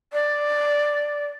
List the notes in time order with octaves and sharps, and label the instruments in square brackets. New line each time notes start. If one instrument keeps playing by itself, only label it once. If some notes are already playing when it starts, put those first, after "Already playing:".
[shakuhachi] D5